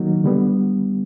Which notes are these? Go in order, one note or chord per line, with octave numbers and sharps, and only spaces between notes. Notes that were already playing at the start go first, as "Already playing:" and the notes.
Already playing: D#3 F#3 A#3 D#4
D3 G3 B3